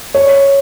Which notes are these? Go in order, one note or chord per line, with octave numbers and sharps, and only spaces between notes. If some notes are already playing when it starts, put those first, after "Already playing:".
C#5